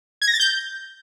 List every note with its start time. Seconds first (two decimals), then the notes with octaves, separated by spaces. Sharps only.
0.22 G#6
0.28 A#6
0.34 A6
0.40 G6